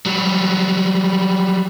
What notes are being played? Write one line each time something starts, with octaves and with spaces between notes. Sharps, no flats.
F#3 G3